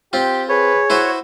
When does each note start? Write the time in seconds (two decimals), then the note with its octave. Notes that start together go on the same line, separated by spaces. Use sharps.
0.13 C4 F4 G4
0.49 G#4 B4 C#5
0.90 E4 F#4 B4 C5